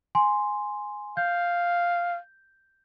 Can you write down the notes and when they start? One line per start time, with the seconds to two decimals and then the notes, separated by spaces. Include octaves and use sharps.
0.15 G#5 C6
1.17 F5 G6